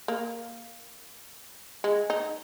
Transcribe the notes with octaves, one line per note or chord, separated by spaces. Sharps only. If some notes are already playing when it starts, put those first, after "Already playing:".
A#3
G#3
D#4